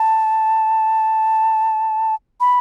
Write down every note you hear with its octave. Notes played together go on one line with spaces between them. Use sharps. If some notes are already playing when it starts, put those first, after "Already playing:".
Already playing: A5
B5